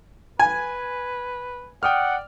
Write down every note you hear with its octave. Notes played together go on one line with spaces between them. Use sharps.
B4 G#5
D5 F#5 G5 D#6 F6